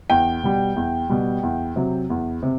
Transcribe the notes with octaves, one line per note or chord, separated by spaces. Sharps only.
E2 G5
B2 G3
E2
B2 G3
E2
C3 F#3
E2
C3